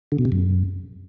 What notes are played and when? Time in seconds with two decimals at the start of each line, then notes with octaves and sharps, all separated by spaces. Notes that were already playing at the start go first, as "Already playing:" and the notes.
0.12 D3
0.19 B2
0.25 C3
0.32 F#2